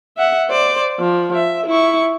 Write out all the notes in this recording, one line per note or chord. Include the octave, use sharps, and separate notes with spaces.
E5 F#5
C5 D5
F3
E5
E4 C#6